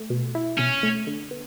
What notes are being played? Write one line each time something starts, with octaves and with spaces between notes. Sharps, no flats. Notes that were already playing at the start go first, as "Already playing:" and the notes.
Already playing: A3
B2
E4
B2 C#4
A3
D3
B3